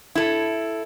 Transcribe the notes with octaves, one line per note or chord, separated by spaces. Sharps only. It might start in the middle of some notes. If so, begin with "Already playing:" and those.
E4 A4